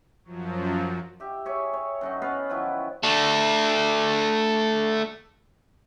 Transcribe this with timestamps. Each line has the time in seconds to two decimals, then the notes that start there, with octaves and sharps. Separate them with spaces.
0.24 F#2 F3 F#3
1.20 G4 E5
1.46 G#4 C#5 E5
1.73 C#5
2.01 F#2 F#3 D#4
2.22 B3 C#4 B4 F5
2.50 D#3 F3 F#3 E4
3.03 A3 D4